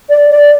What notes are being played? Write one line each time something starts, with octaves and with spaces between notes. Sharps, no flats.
D5
D5